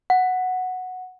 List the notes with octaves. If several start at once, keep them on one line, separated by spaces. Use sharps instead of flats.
F#5